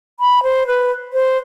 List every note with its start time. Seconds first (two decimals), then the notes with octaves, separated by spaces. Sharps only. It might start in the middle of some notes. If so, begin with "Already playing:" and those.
0.20 B5
0.43 C5
0.67 B4
1.13 C5